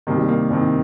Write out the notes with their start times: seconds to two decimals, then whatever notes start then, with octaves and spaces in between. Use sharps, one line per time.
0.07 C2 C3 D#3 A#3
0.18 G3
0.29 A#3
0.50 C2 C3 D#3